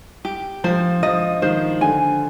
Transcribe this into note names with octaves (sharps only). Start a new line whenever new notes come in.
G4
F3 C5
F3 D#5
D#3 C5
D3 G#5